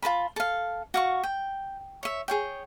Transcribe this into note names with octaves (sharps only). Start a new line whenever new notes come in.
F4 B4 A5 B5
A4 F5
F#4 F5 C#6
G5
C#5 E5
G#4 C#5 G5